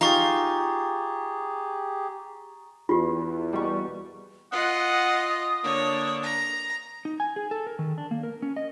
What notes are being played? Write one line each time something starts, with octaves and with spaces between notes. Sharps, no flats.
D#4 F4 G4 G#4 A#5 C#6 A6
E2 F4 G4
B2 G3 C#6
F4 D#5 F#5 D#6
D3 A#3 D4 C#5
A#5
D#4
G#5
G#4
A4
A#4
D#3
D4
A#3
A#4
C#4
D#5